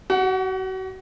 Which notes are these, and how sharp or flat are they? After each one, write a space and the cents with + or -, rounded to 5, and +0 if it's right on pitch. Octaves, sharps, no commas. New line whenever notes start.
F#4 +35 F#5 +0